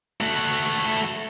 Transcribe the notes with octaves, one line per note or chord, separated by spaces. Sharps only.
A3 F#4